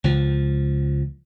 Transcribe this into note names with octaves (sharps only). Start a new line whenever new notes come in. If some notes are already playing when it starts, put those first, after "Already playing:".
C#2 F3